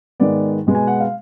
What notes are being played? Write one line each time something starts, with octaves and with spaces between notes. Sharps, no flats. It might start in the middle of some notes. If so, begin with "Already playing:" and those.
G#2 D#3 G#3 B3 D5
B2 G#3 B3
G#5
F#5
F5